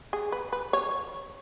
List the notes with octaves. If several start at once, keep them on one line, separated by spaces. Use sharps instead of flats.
G#4
B4
B4
C#5